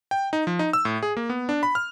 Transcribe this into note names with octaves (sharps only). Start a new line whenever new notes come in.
G5
D#4
F3
D#4
E6
A2
G#4
A#3
B3
D4
B5
F6